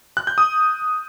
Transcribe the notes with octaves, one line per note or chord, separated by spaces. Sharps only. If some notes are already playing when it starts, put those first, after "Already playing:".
F#6
G6
D#6